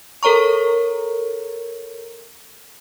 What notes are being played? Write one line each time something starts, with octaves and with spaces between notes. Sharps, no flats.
A4 A#4 C#5 A#5 C#6